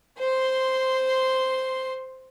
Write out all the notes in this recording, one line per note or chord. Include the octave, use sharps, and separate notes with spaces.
C5 C6